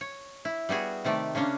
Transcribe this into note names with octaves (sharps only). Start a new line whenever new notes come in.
C#5
E4
G3 B3 F#4 G#4
C3 D#3 A3 D5
C#3 A#3 C#4 D4